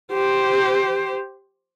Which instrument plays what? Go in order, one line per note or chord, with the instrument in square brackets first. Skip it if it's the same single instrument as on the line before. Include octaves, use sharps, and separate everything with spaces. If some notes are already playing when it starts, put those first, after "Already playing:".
[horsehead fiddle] G4 C5